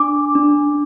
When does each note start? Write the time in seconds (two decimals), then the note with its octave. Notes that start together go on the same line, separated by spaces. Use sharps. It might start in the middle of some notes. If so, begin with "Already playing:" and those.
Already playing: D4 D6
0.35 D4